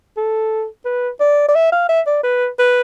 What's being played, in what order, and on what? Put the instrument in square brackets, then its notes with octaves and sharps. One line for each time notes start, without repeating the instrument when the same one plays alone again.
[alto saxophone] A4
B4
D5
D5
E5
F5
E5
D5
B4
B4